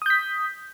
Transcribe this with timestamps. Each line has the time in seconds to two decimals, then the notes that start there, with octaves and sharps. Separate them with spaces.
0.02 D#6
0.06 G6
0.10 B6